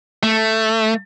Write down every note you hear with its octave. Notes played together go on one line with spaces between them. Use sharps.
A3